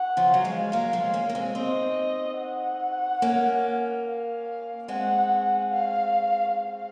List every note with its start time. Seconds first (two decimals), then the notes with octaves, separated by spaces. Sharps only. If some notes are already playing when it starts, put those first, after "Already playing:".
Already playing: F#5
0.17 C#3 F3
0.32 F#3 F5
0.45 F3 G#3
0.72 F#3 A#3
0.93 F3 G#3
1.14 A#3 C#4
1.29 A#3
1.35 G#3 C4
1.55 C4 D#4 D#5
2.39 F#5
3.22 A#3 C#4
4.05 F5
4.88 G#3 C4 F#5
5.71 F5
6.54 F5